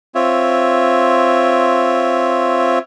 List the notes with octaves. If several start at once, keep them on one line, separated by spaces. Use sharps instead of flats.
C4 F4 C#5 E5